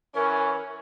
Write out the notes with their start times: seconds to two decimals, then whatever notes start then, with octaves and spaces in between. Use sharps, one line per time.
0.15 F#2 E3 C#4 A#4